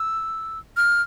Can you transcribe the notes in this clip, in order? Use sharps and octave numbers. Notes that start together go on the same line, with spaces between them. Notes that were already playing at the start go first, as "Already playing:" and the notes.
Already playing: E6
F6